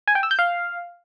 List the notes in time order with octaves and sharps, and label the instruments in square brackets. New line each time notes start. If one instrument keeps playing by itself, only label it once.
[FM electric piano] G#5
G5
E6
G6
F5